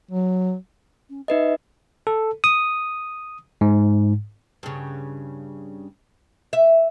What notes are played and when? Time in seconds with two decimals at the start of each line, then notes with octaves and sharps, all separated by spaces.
0.11 F#3
1.09 C#4
1.28 D#4 B4 D#5 E5
2.07 A4
2.44 D#6
3.61 G#2
4.63 G2 C#3
6.53 E5